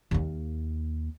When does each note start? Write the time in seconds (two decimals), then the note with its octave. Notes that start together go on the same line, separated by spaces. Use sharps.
0.11 D#2 A#3